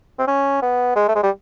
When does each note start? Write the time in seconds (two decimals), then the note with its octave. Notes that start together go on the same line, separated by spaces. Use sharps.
0.19 C4
0.28 C#4
0.62 B3
0.96 G#3
1.08 A3
1.15 G#3
1.23 G3